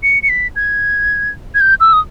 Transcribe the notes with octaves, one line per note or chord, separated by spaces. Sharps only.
C#7
C#7
B6
G#6
G#6
G6
E6
D#6